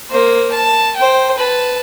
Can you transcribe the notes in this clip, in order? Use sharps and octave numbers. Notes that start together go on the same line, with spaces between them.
A#3 C5
A5
C5 G5
B4 A5